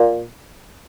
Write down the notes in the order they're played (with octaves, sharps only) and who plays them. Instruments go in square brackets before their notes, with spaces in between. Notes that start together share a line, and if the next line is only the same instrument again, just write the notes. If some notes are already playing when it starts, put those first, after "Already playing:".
Already playing: [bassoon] A#2